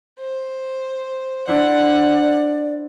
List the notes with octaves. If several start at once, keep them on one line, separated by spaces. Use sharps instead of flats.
C5
D4 E4 C5 D5 F#5